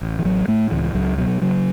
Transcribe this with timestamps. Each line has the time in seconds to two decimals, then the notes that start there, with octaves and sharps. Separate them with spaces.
0.01 A1
0.19 E3
0.24 A1 F#3
0.47 A2 A3
0.71 C#2 E3
0.95 C#2 F#3
1.18 B2 F#3
1.42 C#3 F#3